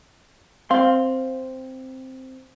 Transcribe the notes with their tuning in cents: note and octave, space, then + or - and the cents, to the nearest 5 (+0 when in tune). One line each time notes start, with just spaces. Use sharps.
C4 +0 F5 +0 C6 +0